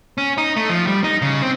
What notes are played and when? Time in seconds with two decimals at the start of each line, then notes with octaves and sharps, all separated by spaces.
0.18 C#4
0.38 D#4
0.56 A3
0.70 F3
0.87 G3
1.04 D#4
1.22 C#3
1.42 C4